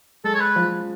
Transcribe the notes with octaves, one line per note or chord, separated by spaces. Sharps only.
G#3 A4
C#5
B4
F3